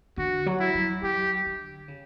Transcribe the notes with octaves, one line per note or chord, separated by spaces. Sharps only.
D3 F#4
F#3
E4
F#3
F#3 G4
D3
C#3